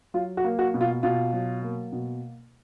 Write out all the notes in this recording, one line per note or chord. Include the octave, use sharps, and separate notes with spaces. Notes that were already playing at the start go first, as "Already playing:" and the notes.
F#3 F4
F#4
A#3
F#4
B2
F4
B2 F4
F#3
A#3
B2